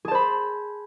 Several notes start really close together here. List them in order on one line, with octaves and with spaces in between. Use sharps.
G#4 A5 C5 B5